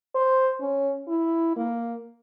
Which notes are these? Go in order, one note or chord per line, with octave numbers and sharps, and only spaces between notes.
C5
C#4
E4
A#3